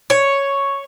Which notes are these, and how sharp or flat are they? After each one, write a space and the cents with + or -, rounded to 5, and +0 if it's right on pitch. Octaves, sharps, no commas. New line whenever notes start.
C#5 +0